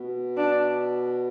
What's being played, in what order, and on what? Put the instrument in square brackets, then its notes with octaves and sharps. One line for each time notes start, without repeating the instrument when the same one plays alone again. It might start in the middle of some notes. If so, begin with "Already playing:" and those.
Already playing: [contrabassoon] B2
[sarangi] D4